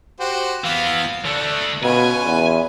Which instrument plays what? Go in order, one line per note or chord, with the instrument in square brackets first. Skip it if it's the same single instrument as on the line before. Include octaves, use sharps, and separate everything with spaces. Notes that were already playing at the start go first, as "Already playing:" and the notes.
[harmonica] F#4 G4 C5
[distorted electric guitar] E3 B3 [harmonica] F5
[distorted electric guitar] D3 A3 [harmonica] D4
[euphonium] B2 [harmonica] C#4 F4 B4 [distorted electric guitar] G#5
[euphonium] E2